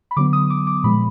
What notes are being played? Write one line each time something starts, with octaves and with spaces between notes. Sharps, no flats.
B5
D3 F#3 B3 D6
D#6
D6
D6
A#2 F3 G#3 B5